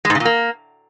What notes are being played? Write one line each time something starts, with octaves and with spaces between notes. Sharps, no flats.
G#3
G#2
C#3
A#2
A#3